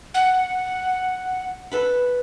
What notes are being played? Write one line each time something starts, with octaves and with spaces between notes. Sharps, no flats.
F#5
A4 B4 B5